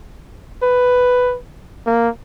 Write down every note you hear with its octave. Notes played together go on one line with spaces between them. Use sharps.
B4
A#3